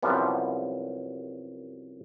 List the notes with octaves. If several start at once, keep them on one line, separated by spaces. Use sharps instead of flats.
C2 F#2 F3 G3 B3